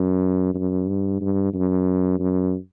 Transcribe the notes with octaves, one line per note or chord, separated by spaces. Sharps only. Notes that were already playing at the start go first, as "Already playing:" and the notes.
Already playing: F#2
F#2
G2
G2
F#2
F#2